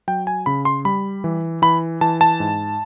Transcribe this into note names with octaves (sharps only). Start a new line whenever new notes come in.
F#3 G5
G#5
C#3 B5
C6
G3 B5
E3
E3 B5
E3 A5
A5
G#2